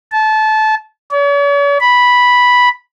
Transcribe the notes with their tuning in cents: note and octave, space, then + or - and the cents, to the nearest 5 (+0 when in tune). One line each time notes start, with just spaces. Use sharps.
A5 -20
C#5 +45
B5 -5